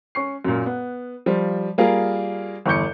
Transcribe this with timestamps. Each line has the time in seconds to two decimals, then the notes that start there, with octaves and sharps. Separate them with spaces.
0.15 C#4 C#6 C7
0.45 F#2 A#2
0.66 B3
1.26 F3 G3
1.78 G3 A#3 F4 G#4 A#4
2.66 G1 E2 C#6 D6 G6 C#7